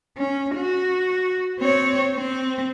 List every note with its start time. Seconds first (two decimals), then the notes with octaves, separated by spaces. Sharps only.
0.17 C#4
0.55 F#4
1.59 C4 C#5
2.14 C4